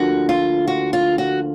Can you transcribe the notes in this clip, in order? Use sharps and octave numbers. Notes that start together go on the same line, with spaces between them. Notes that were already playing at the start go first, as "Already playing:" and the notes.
Already playing: D2 D3 F3 A#3 F#4
F4
F#4
F4
F#4